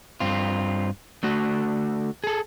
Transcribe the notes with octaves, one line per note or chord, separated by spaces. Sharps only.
G2 C4 F4
D3 A3 F#4
G#4 A4